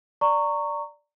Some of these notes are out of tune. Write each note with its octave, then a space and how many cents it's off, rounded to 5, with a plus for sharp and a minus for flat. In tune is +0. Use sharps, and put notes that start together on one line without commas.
D5 +0 A#5 -20 C#6 +0